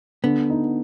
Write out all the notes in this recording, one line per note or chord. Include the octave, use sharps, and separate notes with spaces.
D3 B3
D#4